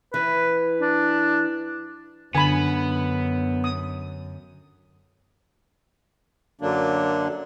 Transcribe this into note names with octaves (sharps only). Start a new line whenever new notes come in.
E3 B4
D4
F#2 D3 B3 G#5 B5
D#6
F#2 D3 F#3 A#3 D4